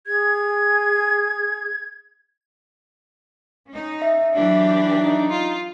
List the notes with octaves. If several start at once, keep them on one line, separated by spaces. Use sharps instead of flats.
G#4 G#6
C#4 D#4
E5
E3 F#3 D4 G4
D#4
F4